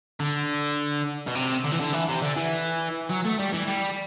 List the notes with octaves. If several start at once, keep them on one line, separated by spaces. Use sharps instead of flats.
D3
B2
C3
D3
E3
D3
E3
C3
D3
E3
F#3
A3
G3
E3
G3